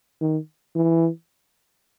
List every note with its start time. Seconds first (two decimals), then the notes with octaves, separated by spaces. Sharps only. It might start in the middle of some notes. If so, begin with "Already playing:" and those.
0.21 D#3
0.76 E3